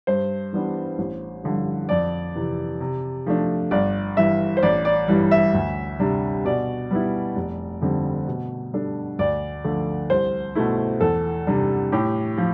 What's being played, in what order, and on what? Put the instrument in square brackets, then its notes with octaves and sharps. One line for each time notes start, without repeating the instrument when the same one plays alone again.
[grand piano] G2 [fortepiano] C5
[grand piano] E3 G3 B3 D4
A1
G2 D3 F3
[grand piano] F2 [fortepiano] D5
[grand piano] C3 E3
C3
F3 A3 D4
[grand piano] G1 [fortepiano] D5
[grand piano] G2 E3 [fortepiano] E5
[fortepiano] C5
[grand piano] A1 [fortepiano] D5
[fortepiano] D5
[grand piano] G2 E3 G3
[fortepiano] E5
[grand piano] D2
C3 G3 D4
[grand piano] B2 [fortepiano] D5
[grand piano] G3 B3 E4
F1
F2 D3 G3 C4
B2
G3 D4 A4
[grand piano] D2 [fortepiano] D5
[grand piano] D3 F3 A3
[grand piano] C2 [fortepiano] C5
[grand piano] B2 A3 E4
[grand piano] E2 [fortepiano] A4
[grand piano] C3 G3 D4
[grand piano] A2 [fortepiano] G4
[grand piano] F3